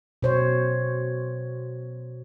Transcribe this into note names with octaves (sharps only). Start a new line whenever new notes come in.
B2 C5 C#5